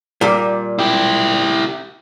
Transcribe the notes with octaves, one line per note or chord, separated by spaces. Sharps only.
A#2 G3
E4 G4